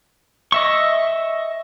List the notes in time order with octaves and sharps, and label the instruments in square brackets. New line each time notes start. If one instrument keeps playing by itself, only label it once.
[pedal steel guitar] D#5 E5 C#6